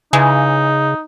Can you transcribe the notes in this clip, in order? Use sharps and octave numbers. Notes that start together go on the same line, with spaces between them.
C#3 E3 G#3 D#4